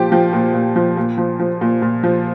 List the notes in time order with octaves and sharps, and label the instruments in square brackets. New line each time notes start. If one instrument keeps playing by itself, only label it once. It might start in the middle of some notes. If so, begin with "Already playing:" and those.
Already playing: [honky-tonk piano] A#2 F3 G4
F3
A#2
A#2
F3
A#2
F3
F3
A#2
A#2
F3